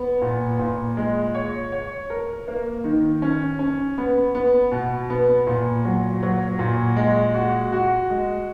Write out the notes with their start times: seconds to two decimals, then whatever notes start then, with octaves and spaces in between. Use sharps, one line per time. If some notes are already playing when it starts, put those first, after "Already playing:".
Already playing: B3
0.22 A#2
0.59 A#2
0.97 G#3
1.34 C#5
1.72 C#5
2.10 A#4
2.48 A#3
2.84 D#3
3.22 C#4
3.59 C#4
3.98 B3
4.35 B3
4.72 B2
5.10 B3
5.47 A#2
5.85 F#3
6.23 F#3
6.59 A#2
6.96 G#3
7.34 F#4
7.72 F#4
8.10 G#3